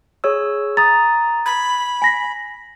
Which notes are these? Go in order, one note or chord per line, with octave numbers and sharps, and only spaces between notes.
G#4 C#5 E6
A#5 D#6 A6
B5 G#6
G#5 A#6 B6